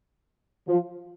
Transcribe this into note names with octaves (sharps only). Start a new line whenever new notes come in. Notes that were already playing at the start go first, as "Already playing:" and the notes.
F3